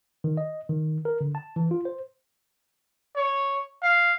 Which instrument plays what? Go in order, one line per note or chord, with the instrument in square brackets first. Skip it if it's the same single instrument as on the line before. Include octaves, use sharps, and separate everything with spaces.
[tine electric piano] D#3
D#5
D#3
A#4
D3
A5
E3
F4
C5
[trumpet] C#5
F5